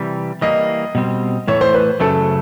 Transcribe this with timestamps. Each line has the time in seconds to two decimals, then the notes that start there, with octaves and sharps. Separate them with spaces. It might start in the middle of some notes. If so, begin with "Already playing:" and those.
Already playing: C3 E3 G3
0.41 E3 G3 A#3 D#5
0.95 B2 G3 C4
1.48 A2 E3 A3 C#5
1.61 C5
1.74 B4
2.00 F#2 C#3 F#3 A3 A4